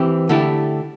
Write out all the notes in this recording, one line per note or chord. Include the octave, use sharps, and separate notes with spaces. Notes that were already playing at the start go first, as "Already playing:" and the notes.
Already playing: E3 C4 G4
D3 A3 E4 G4